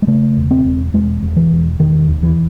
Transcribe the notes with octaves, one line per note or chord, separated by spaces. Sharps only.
G#3
C#3 A3
E1
C4
E1
E1 G#3
E1
E3
E1
E1 D#3
D#2
E3